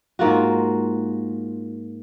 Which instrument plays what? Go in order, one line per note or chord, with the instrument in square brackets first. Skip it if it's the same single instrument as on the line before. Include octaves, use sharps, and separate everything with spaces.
[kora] G#2 A#3 F4 F#4